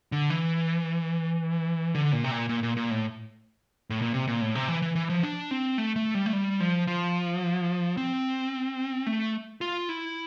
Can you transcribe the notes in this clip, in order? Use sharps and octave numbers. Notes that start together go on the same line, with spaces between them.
D3
E3
D3
A#2
C3
A#2
A#2
A#2
A#2
A2
A2
A#2
C3
A#2
A2
C3
E3
E3
E3
F3
D4
C4
A3
A3
G3
A3
G3
F3
F3
C4
A3
F4
E4